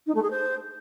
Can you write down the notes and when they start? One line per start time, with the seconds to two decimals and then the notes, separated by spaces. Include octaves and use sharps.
0.06 D#4
0.14 A3
0.22 G#4
0.30 C5